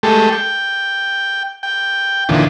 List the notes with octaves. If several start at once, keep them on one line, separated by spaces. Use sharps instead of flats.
G#3 A3 G4 A4
G5
G5
D#2 A#2 D3 E3 F3